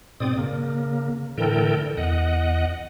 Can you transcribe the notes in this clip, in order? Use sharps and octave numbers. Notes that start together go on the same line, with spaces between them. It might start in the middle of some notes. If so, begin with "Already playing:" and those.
G#2 B2 C4 D5 D#6
C#3 A#3
A2 D3 E3 A4 A#4 G5
E2 D#5 F#5